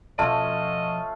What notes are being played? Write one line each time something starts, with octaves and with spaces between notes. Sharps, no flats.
B2 F3 A3 C#4 F4 D#5 A5